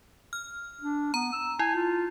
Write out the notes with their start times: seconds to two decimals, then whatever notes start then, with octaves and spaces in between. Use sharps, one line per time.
0.33 F6
0.81 D4
1.14 B3 A#5
1.33 E6
1.59 E4 G#5
1.75 F4